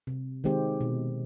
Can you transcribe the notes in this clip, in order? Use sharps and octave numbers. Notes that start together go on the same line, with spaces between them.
C3
D#3 G#3 C4 G4
B2